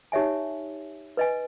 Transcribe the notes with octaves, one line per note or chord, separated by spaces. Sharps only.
D#4 G4 C#5 E5 G#5
B4 D#5 G#5